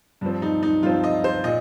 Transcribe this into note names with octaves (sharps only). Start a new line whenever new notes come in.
G2 F3 C4
D#4
D#4
G2 F3 C4 F4
D#5
C5
A#2 D#5